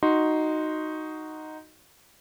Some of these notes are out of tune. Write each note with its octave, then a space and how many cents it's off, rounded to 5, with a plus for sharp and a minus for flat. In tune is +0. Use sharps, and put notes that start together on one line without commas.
D#4 +0 F#4 +0 C6 +0